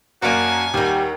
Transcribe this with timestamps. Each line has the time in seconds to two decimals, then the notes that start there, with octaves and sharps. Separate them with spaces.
0.22 F#2 A#3 F#4 D5 F5 G#5 A5 D#7
0.74 D#2 G3 D#4 F#5